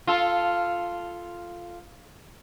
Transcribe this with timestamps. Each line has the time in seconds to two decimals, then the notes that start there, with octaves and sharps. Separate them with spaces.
0.07 F4 A4